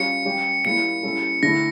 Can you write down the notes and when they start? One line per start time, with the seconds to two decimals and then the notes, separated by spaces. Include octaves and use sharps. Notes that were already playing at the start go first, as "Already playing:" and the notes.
Already playing: G3 C#4 F4 C#7
0.25 G3 C#4 G4
0.65 A#2 G3 A#3 E4 C#7
1.03 G3 C#4 E4 A4
1.43 D3 A3 E4 A4 A#6